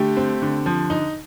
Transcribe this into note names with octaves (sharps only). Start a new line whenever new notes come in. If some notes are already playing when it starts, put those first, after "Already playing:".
Already playing: D3 A3 G4
C4
D3
F3
D#4